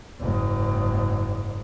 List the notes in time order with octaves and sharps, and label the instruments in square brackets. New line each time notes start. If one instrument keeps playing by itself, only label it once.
[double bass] F#1 G#2